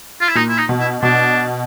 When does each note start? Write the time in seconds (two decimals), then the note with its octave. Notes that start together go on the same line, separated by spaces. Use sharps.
0.21 F4
0.28 E4
0.35 A#2 D#4
0.49 E4
0.58 D#4
0.69 B2
0.80 E4
1.02 B2 D4